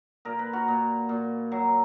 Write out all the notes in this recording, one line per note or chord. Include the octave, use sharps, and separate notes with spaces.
A#2 A#4
B4
F#4 A#4
A#2
A#2
F#3